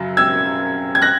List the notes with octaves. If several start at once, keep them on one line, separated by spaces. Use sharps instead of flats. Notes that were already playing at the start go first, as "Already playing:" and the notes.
Already playing: F#2 C#3 F#3
E6 G#6
G#6
F#6 A#6